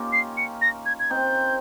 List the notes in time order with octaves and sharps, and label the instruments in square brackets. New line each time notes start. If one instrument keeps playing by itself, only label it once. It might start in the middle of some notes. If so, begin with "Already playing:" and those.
Already playing: [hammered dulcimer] A#3 C#4 D#4 F4 G4
[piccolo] C7
C#7
A#6
G#6
G#6
[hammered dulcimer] C4 D#4 [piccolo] G6